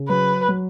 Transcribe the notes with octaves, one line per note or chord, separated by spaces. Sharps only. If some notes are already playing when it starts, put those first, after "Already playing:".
Already playing: C#3
F#3 B4
F#3